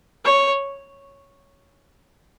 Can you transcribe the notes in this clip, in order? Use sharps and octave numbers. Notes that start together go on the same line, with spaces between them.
C#5